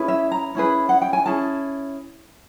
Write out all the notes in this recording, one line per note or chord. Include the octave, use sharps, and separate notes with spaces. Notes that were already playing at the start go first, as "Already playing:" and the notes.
Already playing: C#4 E4 G#4 B4
E5
A#5
C#4 E4 G#4 B4
F#5
G5
G#5
C#4 E4 G#4 A5